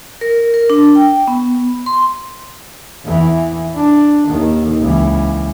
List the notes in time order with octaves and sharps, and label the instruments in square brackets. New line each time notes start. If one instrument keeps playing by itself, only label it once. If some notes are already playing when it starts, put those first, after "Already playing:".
[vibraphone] A#4
A#4
D4
G5
B3
C6
[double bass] E2 E3
D4
D#2 D#3
C#2 E3